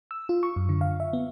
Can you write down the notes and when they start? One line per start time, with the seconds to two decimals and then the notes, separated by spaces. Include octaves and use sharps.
0.11 E6
0.29 F4
0.43 C#6
0.56 F#2
0.69 D3
0.81 F5
1.00 E5
1.13 B3